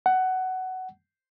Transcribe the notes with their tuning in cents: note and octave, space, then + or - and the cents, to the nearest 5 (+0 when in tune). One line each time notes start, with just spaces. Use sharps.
F#5 +15